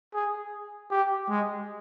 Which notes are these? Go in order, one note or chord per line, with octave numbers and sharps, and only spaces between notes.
G#4
G4
G#3